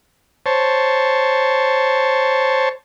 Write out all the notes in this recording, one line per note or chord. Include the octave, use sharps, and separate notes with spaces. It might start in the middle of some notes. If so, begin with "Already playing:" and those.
C5 C#5 A5